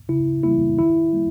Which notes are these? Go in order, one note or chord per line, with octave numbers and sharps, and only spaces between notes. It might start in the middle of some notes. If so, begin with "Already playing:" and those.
C#3 E4
E3 G3 A#3 E4
D#3 E4
G3 A#3